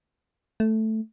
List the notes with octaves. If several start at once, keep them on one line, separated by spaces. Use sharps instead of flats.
A3